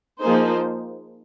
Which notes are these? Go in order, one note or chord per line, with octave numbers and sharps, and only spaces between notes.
F3 A#3 D#4 G#4 C5